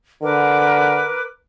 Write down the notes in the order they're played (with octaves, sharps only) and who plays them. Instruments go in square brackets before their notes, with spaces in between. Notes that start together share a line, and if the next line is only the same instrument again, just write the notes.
[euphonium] D3 [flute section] A#4 B4 D6